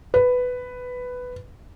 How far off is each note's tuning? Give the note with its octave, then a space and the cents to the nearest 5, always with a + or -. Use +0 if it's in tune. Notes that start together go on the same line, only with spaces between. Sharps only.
B4 +10